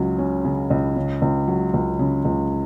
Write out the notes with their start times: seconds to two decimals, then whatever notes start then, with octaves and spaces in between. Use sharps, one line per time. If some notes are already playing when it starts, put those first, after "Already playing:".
Already playing: C#2 C#3 F#3
0.19 C#4
0.45 C#3
0.70 C#2
0.96 C#3
1.22 C#2
1.48 F#3
1.74 C#2
1.99 C#3
2.25 C#2